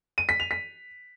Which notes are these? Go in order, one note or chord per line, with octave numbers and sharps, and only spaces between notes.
D#7
B6
F7
B6